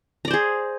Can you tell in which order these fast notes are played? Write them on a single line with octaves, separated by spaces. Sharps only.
A#5 D5 C5 G#4